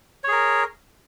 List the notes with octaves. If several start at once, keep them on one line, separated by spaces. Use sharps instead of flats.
G#4 A#4 C#5